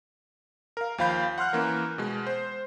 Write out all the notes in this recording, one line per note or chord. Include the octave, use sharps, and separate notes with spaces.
A#4 F5
D#2 F3 F5 B5 G6
F#5 C6 F6 F#6
E3 A#3 C#4 A#4
B2 G#3
C5